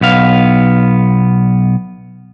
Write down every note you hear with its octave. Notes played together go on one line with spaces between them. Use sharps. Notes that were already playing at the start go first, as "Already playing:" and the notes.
B1 B3 F5